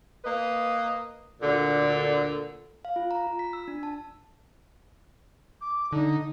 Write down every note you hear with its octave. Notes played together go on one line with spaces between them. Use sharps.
A#3 B4 D#5
D2 A#2 D3
F5
F4
A#5
F4
B6
E6
D4
A5
D6
D3 D#4